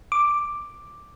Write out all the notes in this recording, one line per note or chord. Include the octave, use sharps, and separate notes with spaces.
D6